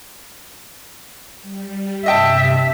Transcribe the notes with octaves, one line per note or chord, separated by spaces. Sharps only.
G3
G2 C3 D#5 E5 G5 A5